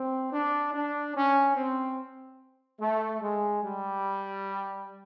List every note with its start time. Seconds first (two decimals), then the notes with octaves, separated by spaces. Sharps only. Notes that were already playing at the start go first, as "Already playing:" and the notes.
Already playing: C4
0.33 D4
0.74 D4
1.15 C#4
1.56 C4
2.81 A3
3.22 G#3
3.63 G3